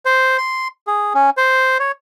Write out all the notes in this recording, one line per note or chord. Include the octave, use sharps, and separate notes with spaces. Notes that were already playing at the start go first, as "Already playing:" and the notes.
C5
C6
G#4
C#4
C5
C#5